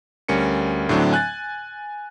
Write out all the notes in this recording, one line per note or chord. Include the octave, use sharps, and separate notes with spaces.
D2 G3 C#4 A#4 C#7
A2 D3 F#3 C4 D4
G#5 F#6 G#6 A6